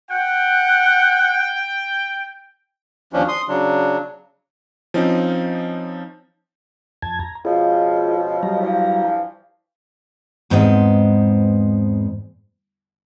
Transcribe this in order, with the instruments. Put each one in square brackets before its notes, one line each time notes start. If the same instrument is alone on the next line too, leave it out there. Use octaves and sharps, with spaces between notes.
[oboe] F#5 [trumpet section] G5
[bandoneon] D#2 F3 C#4 D4
C6 D#6
C#3 F#3 D4
[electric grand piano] F3 C4 C#4 D#4
[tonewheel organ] F2 A5 G#6
A#5
[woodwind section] C#2 B2 F3 [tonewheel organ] F4 G#4
[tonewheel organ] F#3 G3 A#5
[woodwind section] G2 E3 F3
[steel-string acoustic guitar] E2 G#2 B3 C4 D#5